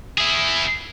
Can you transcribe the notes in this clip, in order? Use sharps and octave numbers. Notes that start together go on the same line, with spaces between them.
E4 G#4